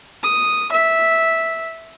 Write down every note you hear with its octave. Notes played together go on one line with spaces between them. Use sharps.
D#6
E5